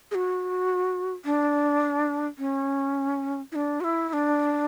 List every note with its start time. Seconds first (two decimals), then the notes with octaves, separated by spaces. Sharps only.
0.11 G#4
0.15 F#4
1.25 D4
2.39 C#4
3.52 E4
3.55 D4
3.81 F#4
3.84 E4
4.09 E4
4.13 D4